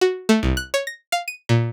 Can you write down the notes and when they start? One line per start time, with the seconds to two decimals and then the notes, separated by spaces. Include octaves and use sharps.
0.01 F#4
0.29 A3
0.43 C2
0.57 F#6
0.74 C#5
0.87 A#6
1.12 F5
1.28 D#7
1.49 A#2